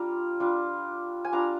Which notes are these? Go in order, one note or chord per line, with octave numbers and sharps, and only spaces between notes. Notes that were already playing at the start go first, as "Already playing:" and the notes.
Already playing: G3 D4 F4 A#5 C6
G3 D4 F4
G#5
G3 D4 F4 A#5